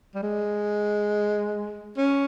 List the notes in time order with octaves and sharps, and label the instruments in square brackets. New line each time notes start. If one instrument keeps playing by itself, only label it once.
[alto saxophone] G3
G#3
C#4